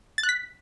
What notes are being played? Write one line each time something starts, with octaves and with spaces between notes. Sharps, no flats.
A6
F#6
B6